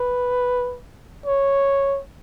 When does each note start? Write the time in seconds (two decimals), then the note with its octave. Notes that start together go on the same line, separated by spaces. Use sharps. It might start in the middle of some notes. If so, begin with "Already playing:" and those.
Already playing: B4
1.26 C#5